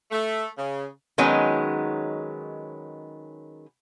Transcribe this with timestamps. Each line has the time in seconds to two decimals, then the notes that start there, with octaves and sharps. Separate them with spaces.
0.11 A3
0.58 C#3
1.18 D#3 F#3 G#3 B3 C#4 D#4